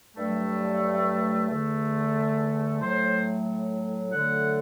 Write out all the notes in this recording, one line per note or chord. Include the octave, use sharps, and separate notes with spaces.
G2 F#3 A3
E2 D3 A3
A2 F#3 A3 C5
D2 D3 F#3 A3 F#5